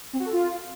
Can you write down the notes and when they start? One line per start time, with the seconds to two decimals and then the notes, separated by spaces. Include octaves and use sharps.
0.13 C4
0.20 F#4
0.26 A4
0.32 F4